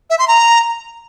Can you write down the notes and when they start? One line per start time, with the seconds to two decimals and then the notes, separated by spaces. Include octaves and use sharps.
0.10 E5
0.19 C6
0.28 A#5